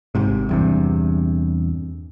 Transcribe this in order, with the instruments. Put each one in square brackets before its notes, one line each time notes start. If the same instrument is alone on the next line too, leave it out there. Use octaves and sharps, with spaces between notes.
[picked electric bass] G#1 G#2 C3
E2 G2 C3